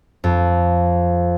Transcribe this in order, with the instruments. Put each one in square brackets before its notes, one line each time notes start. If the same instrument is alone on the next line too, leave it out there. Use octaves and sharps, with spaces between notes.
[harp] F2